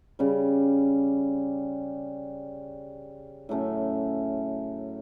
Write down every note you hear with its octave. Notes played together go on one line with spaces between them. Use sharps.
C#3 G3 C#4
A2 F#3 A3 C#4